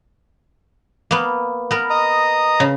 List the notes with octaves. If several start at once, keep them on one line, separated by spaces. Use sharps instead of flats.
A#3 B3
B3 A#4
D#5 A#5 D#6
C#3